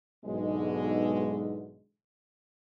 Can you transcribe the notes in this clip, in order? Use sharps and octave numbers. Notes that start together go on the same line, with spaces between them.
B1 G#2 B2 D3 E3 G#3